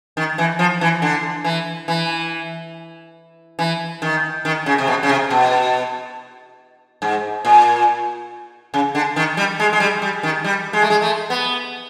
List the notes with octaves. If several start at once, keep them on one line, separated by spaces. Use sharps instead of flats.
D#3
E3
F3
E3
D3
E3
E3
E3
D#3
D#3
C#3
C3
B2
C#3
C3
B2
G#2
A#2
C#3
D3
D#3
G3
G#3
G#3
G3
G3
D#3
G3
G#3
A3
G#3
A3
B3